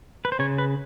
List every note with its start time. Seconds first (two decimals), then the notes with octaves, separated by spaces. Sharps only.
0.25 B4
0.32 C5
0.39 C#3 C#5
0.58 B4